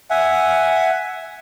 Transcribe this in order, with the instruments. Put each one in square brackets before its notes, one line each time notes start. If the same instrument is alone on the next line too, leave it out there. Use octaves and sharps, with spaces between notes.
[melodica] E5 F#5 G#5